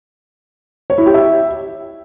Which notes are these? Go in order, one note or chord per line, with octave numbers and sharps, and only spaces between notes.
C#5
E4
G4
E5